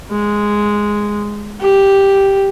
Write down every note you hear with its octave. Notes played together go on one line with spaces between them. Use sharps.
G#3
G4